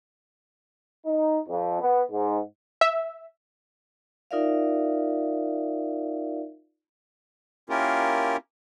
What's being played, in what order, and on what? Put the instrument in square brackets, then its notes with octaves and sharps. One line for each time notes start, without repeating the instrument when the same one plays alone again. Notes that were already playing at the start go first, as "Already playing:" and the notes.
[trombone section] D#4
F2
B3
G#2
[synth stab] E5
[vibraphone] D#4 F4 A#4 D5 E5 F5
[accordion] A#3 C#4 E4 F4 G4 A#4